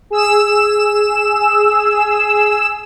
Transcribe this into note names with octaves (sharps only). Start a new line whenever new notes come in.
G#4 E6 E7